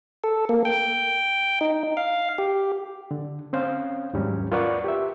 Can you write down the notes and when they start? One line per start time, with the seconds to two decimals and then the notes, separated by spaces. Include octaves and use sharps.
0.24 A4
0.49 A#3
0.65 G5
1.61 D#4
1.97 F5
2.38 G4
3.11 D3
3.53 C4 C#4 C5 F5
4.13 D#2 G#2 F#3 G3 C#4
4.52 F4 A#4 B4 D5 F#5 C#6
4.84 G4 E5